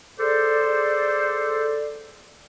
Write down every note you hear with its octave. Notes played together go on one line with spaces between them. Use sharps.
G#4 A4 C5 D5